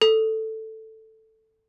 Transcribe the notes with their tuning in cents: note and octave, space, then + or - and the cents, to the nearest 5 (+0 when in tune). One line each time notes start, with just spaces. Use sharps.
A4 +5